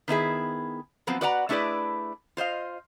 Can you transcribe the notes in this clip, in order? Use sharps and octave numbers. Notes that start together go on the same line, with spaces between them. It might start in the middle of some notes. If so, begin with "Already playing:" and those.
D#3 B3 E4 G#4
F3 F#3 B3 C4
F#4 B4 D5 F#5 G5 A#5
A3 D4 E4 G#4 B4 D5
F4 C5 D#5 F5